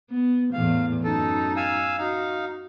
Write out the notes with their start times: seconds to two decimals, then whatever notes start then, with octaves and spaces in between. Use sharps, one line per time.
0.10 B3
0.53 E2 A2 E3 F5
1.04 F#2 D#4 A4
1.57 F5 G#5 E6
1.98 D#4 F#4 F5